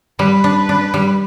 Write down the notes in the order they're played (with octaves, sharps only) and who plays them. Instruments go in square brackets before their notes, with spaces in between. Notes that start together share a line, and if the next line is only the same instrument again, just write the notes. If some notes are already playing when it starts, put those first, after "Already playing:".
[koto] G3 [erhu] B4
[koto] D4
D4
G3